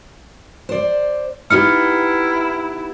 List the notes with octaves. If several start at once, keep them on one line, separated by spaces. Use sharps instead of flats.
C5 D5
B3 D#4 E4 G4 F6 C#7